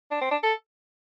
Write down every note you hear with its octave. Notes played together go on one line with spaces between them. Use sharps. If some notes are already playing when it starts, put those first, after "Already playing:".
D4
C4
D4
A4